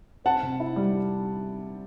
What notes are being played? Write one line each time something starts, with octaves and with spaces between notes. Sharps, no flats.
C4 F#5 A5
C3
E4
G3